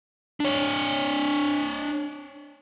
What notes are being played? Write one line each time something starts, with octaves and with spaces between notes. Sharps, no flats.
D4 C#5